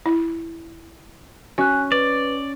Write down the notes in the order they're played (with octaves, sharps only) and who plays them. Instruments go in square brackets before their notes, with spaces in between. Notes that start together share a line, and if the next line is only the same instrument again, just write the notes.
[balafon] E4
[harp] C#4 [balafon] F#4 [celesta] G#5 F#6
[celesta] B4 [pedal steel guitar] D5